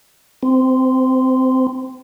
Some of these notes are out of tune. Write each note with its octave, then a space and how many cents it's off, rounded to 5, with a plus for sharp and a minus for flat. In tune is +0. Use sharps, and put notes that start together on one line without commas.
C4 -15